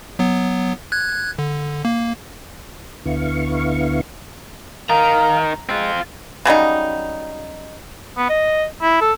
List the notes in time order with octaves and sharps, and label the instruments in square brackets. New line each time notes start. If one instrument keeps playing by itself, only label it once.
[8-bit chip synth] F#3 B3
F#6 G#6
D3
A#3
[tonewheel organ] D2 D3 B3 E4 F5 C#6
[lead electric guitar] D#3 [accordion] A#4 F5 [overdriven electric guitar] A#5
[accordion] G#3 [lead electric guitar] C4 F4
[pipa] C#3 F#3 G3 D#4
[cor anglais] B3
D#5
E4
A4